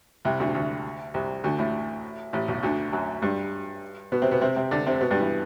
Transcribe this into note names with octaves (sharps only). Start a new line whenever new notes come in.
C2 C3
D2 D3
D2 D3
C2 C3
D2 D3
A1 A2
A1 A2
B1 B2
D2 D3
F#2 F#3
G2 G3
B2 B3
C3 C4
B2 B3
C3 C4
C3 C4
D3 D4
C3 C4
B2 B3
G2 G3
E3